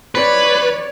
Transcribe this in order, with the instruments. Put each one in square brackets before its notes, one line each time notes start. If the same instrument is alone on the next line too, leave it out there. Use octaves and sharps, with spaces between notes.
[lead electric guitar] B4 [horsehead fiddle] C#5 D5